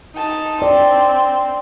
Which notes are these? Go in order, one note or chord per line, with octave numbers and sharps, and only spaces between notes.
D#4 A5
C4 D5